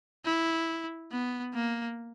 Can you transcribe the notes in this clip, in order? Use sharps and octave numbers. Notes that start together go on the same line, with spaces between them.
E4
B3
A#3